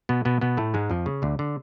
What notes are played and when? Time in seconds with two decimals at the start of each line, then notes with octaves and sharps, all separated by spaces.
0.09 B2 B3
0.25 B2 B3
0.41 B2 B3
0.57 A2 A3
0.74 G#2 G#3
0.90 F2 F3
1.06 C#3
1.22 D2 D3
1.39 D3